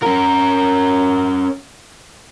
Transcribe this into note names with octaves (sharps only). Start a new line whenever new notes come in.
C#4 A#4